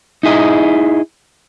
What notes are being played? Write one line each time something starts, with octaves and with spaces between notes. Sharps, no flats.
D#4 E4 G#4 D#5